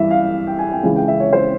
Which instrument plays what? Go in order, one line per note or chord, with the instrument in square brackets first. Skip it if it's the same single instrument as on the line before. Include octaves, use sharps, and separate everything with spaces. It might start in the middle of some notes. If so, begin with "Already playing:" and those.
Already playing: [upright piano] G2 E3 E5
F5
G5
G#5
G5
C#2 C#3 E3
G5
E5
C#5
C5